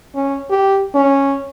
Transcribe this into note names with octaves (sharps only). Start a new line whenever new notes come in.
C#4
G4
C#4